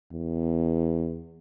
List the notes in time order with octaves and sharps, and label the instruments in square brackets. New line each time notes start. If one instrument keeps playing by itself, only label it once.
[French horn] E2